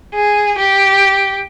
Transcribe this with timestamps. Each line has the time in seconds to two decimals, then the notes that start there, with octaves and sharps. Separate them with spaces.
0.15 G#4
0.58 G4